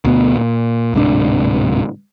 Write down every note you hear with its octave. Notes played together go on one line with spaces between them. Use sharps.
D2 B2 B3
A#2
D1 G#2 C3 D4